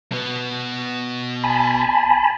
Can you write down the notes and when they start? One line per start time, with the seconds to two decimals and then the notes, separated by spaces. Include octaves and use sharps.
0.12 B2 B3
1.44 G#5 A5 B5